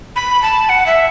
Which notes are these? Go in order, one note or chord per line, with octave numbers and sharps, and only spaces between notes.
B5
A5
F#5
E5